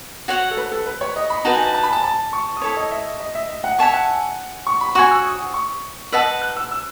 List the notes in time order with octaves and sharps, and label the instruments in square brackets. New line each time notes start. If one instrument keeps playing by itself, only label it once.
[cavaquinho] F#4 C#5 F#5
[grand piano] A4
B4
A4
B4
C#5
D#5
B5
[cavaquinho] D#4 F#4 B4 [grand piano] A5
[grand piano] G#5
A5
A5
B5
A5
A5
C#6
D#6
[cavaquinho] E4 A4 C#5 [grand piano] C#6
[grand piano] D#5
E5
D#5
E5
E5
F#5
[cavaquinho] C#5 E5 A5 C#6 [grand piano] G#5
[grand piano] F#5
C#6
B5
[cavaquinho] F#4 C#5 G#5 [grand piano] C#6
[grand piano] E6
D#6
C#6
[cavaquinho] B4 D#5 F#5 A5 [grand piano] E6
[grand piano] F#6
E6
E6